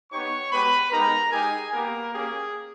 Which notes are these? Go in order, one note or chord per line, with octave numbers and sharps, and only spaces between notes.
B3 D#4 G4 C#5 C#6
G#3 B3 G4 B4 B5
G#3 B3 D#4 G4 A#4 A#5
G#3 D#4 G4 G#4 G#5
A#3 B3 G4 A#4
A#3 C#4 G4 G#4